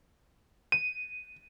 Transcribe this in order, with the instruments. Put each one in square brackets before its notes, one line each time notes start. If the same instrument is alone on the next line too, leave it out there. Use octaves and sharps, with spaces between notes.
[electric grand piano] D#7